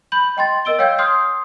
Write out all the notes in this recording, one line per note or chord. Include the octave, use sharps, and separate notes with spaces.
B5 G6 F#7
D#5 G5 C6 A6
A#4 D#5 E6 D7 G7
C#5 F5 G5 E6 G6 G#6
C6 D#6 F6 G6 C7